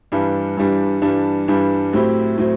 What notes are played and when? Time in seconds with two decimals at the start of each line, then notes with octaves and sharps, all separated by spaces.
0.12 G2 E3 G3 D4
0.57 G2 E3 G3 D4
1.02 G2 E3 G3 D4
1.48 G2 E3 G3 D4
1.93 A2 F#3 C4 E4 G4
2.38 A2 F#3 C4